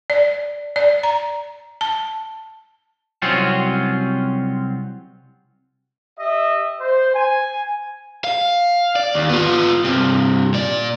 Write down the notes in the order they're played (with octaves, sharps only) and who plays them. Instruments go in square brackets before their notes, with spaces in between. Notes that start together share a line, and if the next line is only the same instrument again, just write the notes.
[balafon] D5
D5
A#5
A5
[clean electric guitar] C2 F#3 C4 C#4 F4
[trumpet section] G4 D#5 E5
C5
G#5
[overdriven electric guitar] F5
D5
D#2
B3 F4
G2 C3
A#2 D5